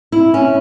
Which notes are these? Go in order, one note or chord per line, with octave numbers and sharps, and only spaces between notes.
E4
C#4